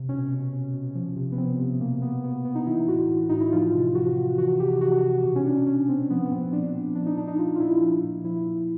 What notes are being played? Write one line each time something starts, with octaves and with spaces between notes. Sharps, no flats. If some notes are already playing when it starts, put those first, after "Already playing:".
Already playing: C3
B2 C#4
B2
B2
B2
F3
C3
B3
F3 C4
C3
B2 A#3
B2 B3
B2 B3
B2 B3
D#4
E3 E4
A2 F#4
E3
A2 D#4
E4
F3 F4
C3
F3 F#4
C3
E3 F#4
C3 G4
E3 F#4
C3
B2
C#4
B2 D4
B2 C#4
B2 C4
F3 B3
B3
A#2 C4
F3 D4
A#2
F3 D4
D#4
A#2 D4
D#4
F3 F4
F4
A#2 E4
F3
A#2
F3 E4
A#2